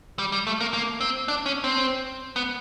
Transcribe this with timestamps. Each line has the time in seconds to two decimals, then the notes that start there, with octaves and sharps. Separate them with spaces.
0.19 G3
0.32 G3
0.47 A3
0.60 A#3
0.73 A#3
1.01 C4
1.28 D4
1.46 C#4
1.64 C4
2.36 B3